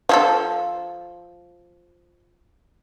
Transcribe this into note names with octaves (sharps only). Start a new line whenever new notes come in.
F3 G#4 A4